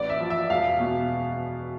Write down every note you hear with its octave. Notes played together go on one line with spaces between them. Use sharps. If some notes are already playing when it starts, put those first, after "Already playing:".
Already playing: A1 D5
E5
F3
E5
E1 F5
B2